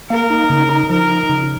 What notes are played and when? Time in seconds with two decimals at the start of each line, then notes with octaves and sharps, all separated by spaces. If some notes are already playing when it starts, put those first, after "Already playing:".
0.10 A#3 A#4
0.30 D#4
0.50 C#3
0.69 D#4
0.90 F3 A#4
1.09 D#4
1.29 C#3